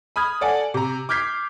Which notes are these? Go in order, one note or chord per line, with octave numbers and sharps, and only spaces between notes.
B5 D#6 F6 G#6
A4 D5 F#5 G#5
C3 A#5
D6 F6 G6 G#6 B6 C7